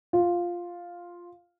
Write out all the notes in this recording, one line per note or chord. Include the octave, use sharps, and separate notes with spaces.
F4